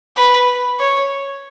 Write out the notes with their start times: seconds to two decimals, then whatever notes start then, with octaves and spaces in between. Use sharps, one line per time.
0.16 B4
0.79 C#5